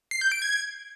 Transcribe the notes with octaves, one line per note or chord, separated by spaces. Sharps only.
C7
G6
D7
G#6